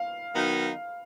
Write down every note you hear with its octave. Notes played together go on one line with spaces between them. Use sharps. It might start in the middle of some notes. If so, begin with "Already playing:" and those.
Already playing: F5
D#3 F#3 B3 D#4